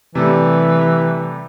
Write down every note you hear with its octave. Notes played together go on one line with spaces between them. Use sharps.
C3 E3 G3 A3